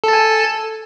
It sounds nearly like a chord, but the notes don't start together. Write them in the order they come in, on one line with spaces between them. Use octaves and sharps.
A4 A5 G#5